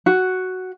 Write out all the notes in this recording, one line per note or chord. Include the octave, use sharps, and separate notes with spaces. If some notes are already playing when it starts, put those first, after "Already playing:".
F#4